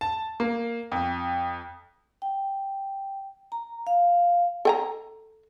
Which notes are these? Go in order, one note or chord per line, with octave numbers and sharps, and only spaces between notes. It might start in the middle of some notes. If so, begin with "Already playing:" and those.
A5
A#3
F2
G5
A#5
F5
A4 G5 A#5